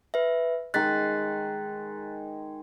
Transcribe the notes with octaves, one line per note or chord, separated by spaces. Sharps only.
B4 E5
D#3 G#3 F#6 A6 B6